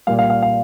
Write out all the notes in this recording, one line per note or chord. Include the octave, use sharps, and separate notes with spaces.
A#2 G3 A#3 F5
F5
F5
F5